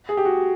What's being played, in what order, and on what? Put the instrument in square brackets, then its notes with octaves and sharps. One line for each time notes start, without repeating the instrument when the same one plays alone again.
[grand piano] G#4
G4
F#4